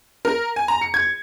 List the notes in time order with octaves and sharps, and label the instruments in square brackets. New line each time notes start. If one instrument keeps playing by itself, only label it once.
[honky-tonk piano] A#4
G#5
A#5
C#7
G#6